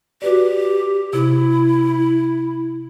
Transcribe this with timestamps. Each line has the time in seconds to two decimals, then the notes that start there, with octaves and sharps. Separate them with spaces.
0.22 F#4 G4 B4 D5
1.13 C3 E4